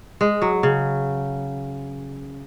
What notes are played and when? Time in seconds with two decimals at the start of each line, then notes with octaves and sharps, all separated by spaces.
0.21 G#3
0.42 F#3
0.63 C#3